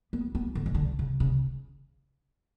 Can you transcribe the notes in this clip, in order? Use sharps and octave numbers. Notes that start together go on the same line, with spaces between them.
B3
B3
D3
E3
D3
C#3
C#3